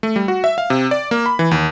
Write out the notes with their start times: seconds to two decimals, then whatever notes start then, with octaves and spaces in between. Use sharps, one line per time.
0.03 A3
0.16 G3
0.28 F#4
0.44 E5
0.58 F5
0.70 C3
0.91 D5
1.11 A#3
1.26 B5
1.39 E3
1.51 D#2